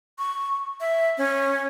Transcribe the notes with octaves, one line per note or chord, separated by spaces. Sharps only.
C#6
E5
C#4